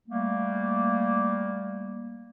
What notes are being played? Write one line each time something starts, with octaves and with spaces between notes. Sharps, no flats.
G3 A3 A#3